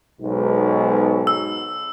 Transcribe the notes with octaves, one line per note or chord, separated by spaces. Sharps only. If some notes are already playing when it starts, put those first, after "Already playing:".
B1 G#2 B2
E6